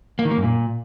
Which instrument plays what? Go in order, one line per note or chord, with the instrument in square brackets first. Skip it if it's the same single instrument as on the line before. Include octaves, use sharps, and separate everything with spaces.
[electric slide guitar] A#3
D#3
A#3
F#2
A#2